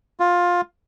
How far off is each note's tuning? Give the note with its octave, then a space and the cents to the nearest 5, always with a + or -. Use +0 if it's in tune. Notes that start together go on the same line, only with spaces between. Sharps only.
F4 +15